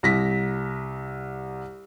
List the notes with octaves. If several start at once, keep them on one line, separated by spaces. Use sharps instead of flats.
C2 A#6 B6